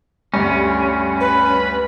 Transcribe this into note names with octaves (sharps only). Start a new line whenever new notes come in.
D2 G2 C#4
B4